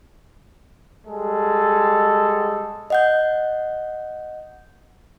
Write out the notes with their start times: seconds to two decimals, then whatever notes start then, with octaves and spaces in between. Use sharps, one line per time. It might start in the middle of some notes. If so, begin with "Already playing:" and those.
1.07 G3 G#3 A4
2.90 D#5 F#5 G6